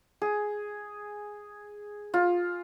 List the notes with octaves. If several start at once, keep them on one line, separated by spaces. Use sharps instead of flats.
G#4
F4